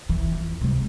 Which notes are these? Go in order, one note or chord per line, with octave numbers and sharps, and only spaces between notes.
E3
F2
C3 G#3